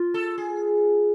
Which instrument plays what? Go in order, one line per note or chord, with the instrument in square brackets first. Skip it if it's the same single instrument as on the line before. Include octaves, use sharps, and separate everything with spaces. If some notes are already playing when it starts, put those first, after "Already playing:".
Already playing: [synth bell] F4
[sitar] A4
G#4